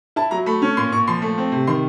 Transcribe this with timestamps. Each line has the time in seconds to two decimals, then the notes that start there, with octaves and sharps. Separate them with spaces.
0.16 E4 A5
0.31 F#3 A#5
0.46 A3 B5
0.62 C#4
0.77 A#2 C6
0.92 A#2 C#6
1.07 F3 C6
1.22 A3
1.38 C4
1.52 C3
1.67 D#3 C6